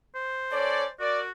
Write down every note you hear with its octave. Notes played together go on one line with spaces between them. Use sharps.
C5
C#4 A4 C#5 D5
F#4 A#4 D5